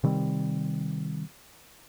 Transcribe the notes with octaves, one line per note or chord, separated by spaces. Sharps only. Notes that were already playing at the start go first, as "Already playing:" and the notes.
C3 D#3 G3 C4